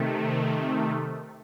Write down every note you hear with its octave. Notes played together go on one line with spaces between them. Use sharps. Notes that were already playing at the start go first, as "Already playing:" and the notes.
Already playing: C3 D#3 A3